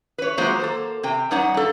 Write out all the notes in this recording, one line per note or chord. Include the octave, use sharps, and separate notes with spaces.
B4 C#5
F#3 G#3 A#3 F4 C5 C#5
A#3 A4 C5
C3 G5
F#2 G3 D#4 C#5 F#5
G2 A4